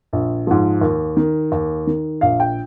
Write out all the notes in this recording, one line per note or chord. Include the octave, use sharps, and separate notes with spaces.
A#1
G#2 F3
D#2
D#3
D#2
D#3
A#1 F5
G5